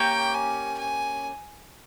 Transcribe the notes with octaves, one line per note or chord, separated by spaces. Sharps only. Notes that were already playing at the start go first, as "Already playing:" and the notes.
Already playing: A#3 C#4 G4 G5
G#5
G#5